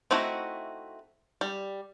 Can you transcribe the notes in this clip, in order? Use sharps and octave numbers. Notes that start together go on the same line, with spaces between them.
A3 C4 D#4 E4 F#4
G3